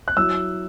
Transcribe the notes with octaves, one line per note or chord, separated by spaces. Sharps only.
F#6
F#3 E4 E6